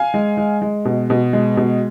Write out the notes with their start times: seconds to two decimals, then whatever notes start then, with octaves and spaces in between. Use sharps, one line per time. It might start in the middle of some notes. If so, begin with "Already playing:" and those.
Already playing: F5 G#5
0.14 G#3
0.37 G#3
0.62 G#3
0.85 B2
1.10 B2
1.33 G#3
1.57 B2